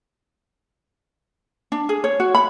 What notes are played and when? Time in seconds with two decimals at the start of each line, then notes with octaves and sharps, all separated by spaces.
1.72 D4
1.89 G#4
2.04 C#5
2.20 F#4
2.35 B5